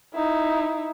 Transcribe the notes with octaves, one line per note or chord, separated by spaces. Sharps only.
D#4 E4